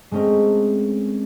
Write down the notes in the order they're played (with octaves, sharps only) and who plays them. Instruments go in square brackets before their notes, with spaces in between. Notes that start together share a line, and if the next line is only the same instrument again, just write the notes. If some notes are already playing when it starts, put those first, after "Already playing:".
[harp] G#3 A3 C4 C#4 A#4